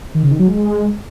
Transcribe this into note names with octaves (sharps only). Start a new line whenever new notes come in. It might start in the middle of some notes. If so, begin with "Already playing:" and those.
D#3
C#3
D#3
F#3
G#3